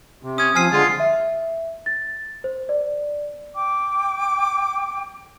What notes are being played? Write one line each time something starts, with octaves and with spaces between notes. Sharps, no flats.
C3
C#4 D#6 G#6
F3 C4 G#5 D#6 F6 C7
D3 G#3 F4
E5
A6
C5
D5
G5 D6